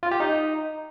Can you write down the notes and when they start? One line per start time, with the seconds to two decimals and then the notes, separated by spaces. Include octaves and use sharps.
0.03 F4
0.11 G4
0.20 D#4